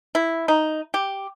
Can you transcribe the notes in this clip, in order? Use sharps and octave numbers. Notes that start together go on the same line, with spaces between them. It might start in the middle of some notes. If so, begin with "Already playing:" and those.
E4
D#4
G4